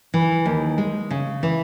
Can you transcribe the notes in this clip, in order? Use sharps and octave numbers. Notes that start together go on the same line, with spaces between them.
E3
D#2
G#3
C#3
E3